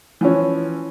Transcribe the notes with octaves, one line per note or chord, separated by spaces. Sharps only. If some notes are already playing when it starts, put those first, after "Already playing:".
E3 F3 C#4